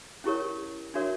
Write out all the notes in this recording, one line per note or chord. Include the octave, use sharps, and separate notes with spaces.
C#4 E4 G4 A#4 C#5
D4 F#4 A#4 C#5 E5